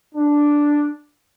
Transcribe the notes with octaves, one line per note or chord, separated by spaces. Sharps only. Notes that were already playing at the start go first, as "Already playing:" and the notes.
D4